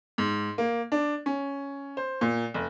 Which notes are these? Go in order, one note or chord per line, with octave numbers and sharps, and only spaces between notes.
G#2
A#3
D4
C#4
C5
A#2
F1